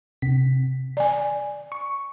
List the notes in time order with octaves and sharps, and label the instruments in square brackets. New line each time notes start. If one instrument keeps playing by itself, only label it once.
[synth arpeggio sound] C3 B6
[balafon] D5 G#5
[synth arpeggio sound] C#6